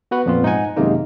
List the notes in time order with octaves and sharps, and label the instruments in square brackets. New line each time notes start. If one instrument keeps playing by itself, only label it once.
[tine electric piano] B3 F#4 B4 F#5
F2 A#2 F3 B3 C4 F4
G#2 D#4 D#5 F#5 G#5
F#2 C3 D#3 G#3 A#3 D#4